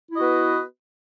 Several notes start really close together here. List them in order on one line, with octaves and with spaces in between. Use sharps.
E4 D#5 F#4 B3 B4